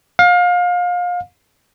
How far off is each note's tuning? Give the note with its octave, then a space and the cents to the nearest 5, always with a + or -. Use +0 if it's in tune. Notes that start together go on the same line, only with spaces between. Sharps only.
F5 +30